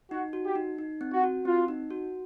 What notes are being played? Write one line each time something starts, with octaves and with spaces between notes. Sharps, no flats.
D#4 F#4
F#4
G4
D#4
D#4
C4
F#4
F#4
C4 F4
D#4
F#4